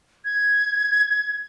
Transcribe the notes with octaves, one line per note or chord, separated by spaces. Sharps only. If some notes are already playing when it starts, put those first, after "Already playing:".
G#6